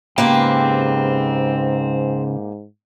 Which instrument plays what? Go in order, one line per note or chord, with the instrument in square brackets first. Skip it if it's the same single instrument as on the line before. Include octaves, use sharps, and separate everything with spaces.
[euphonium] G#2 [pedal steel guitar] C#3 B4 [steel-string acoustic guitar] A#3 G4 [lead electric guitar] C5 G5